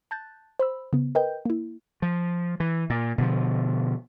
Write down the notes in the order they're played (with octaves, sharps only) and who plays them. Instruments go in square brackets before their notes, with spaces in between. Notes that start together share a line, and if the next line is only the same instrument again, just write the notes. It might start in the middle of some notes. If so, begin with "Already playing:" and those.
[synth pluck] A5 F#6 G6 A6
C5 B5 E6
C#3 B3
A#4 B4 D#5 G5 G6
A#3 E4
[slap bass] F3
E3
A#2
B2 D3 F3